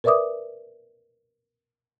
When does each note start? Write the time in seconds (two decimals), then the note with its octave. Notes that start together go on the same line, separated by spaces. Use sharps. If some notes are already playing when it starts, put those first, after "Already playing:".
0.04 A#4 B4 D5 E5 D6 D#6